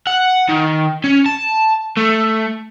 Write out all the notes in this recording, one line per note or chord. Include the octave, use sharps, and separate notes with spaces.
F#5
D#3
C#4
A5
A3